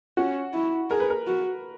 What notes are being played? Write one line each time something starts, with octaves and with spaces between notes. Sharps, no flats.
C#4 F#4
E4
G#4 A#4
B4
A#4
F#4